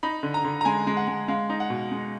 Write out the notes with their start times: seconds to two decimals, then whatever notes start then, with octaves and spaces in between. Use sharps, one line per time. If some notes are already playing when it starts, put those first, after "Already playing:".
0.03 D#4 B5
0.23 D3
0.34 A#5
0.44 D3
0.61 A#5
0.65 G#3 G#5
0.87 G#3
0.97 F#5
1.08 G#3
1.28 G#3 F5
1.50 D#4
1.60 F#5
1.70 B2
1.92 G#3